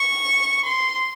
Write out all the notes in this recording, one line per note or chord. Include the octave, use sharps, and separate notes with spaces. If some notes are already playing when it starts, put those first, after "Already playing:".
Already playing: C#6
C6